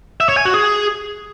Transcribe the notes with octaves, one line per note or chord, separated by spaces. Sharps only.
E5
C#5
G#5
F#4
G#4